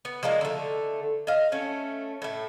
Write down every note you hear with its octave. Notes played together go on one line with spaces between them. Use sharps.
B3
F3 G#3 A#3 D4
D3 A3
D#5 F5
A3 C#4
A2 A3